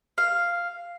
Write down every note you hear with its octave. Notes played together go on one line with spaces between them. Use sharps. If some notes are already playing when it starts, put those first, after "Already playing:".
F5